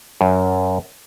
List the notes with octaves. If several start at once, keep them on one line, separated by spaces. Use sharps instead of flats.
F#2